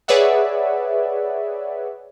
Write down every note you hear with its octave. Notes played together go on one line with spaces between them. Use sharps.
G#4 B4 C#5 D5 E5 F#5